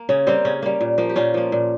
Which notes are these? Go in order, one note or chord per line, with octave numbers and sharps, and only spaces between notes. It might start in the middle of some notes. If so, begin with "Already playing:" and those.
Already playing: A#3
C#3 C#4
G3 A#3 C4
C#3 C#4
G3 A#3
A#2
F3 A#3
G4
A#2 C#4 F4
F3 A#3
A#2